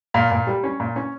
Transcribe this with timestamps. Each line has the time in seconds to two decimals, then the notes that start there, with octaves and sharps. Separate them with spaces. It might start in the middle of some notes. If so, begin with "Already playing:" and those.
0.14 A#2 F5
0.31 A#2
0.47 G3
0.64 C#4
0.80 A#2
0.96 C#4